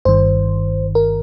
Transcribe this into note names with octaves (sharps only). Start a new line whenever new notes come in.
G1 G2 D#3 C5
A#4